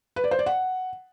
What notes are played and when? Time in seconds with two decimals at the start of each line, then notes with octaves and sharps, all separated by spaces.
0.16 B4
0.24 D5
0.31 C5
0.39 D5
0.46 F#5